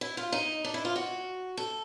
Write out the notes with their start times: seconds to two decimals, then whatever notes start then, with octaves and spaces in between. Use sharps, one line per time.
0.01 E4
0.17 F4
0.32 D#4
0.64 D4
0.74 E4
0.85 F4
0.96 F#4
1.57 A4